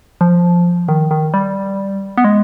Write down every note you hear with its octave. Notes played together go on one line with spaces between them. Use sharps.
F3
D#3
D#3
G3
B3
G#3